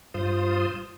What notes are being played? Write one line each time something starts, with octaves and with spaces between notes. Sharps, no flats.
G2 F4 C5 D#6